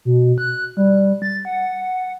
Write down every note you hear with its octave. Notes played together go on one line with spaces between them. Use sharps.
B2
F#6
G3
A6
F#5